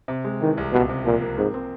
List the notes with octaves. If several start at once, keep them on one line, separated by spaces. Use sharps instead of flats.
C3
G#3
D#3 E3
C2
C#2 B2
C3
A#2 F3
A#3
G#2 C4
C4